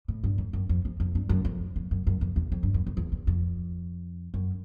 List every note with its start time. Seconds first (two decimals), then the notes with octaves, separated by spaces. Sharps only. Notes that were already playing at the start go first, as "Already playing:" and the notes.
0.08 A2
0.24 G2
0.38 F2
0.53 F#2
0.69 F2
0.85 F2
1.00 F2
1.15 G2
1.29 F#2
1.45 F2
1.76 F2
1.91 F#2
2.07 F#2
2.21 F2
2.36 E2
2.52 F2
2.63 G2
2.74 F#2
2.87 F2
2.97 E2
3.12 E2
3.27 F2
4.34 F#2